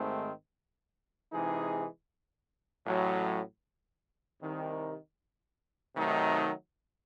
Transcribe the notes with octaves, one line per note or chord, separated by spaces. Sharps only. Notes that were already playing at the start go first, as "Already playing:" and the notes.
Already playing: G#1 G#2 D#3 A3 C4
C3 E3 G#3 D#4 G#4
A1 A2 F#3
C2 C3 D#3
C3 D#3 F#3 A3 D#4